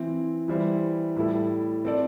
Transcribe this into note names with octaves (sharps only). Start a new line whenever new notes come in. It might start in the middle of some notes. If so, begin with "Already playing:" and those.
Already playing: E3 C4 E4
E3 G3 E4 C5 E5
A2 G3 E4 A4
C4 A4 D5